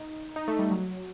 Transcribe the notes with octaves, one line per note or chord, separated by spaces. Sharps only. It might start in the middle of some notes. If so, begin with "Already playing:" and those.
Already playing: D#4
D#4
A3
G3
F#3